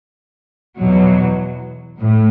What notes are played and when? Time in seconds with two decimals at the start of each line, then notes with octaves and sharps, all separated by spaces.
0.78 E2 B2 F#3
2.00 A2